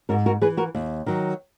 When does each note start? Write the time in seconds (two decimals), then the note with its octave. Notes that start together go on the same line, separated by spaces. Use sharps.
0.09 G#2 F#4 A#4
0.26 F#4 A#4
0.41 E3 G#4 B4
0.57 F#4 A#4
0.75 D#2
1.06 D#3 F#3